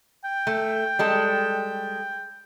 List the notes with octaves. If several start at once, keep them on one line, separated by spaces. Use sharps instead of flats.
G5
A3
G3 G#3 A4